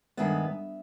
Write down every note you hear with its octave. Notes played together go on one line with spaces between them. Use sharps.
G2 D#3 G#3 B3 E5